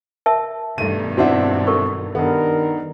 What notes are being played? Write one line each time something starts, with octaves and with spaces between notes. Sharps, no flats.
A#4 E5 A5
G2 B2 D#3 A3 D#7
C4 D4 E4 F#4 F#5
A4 A#4 C#6
G2 D#3 B3 A4 A#4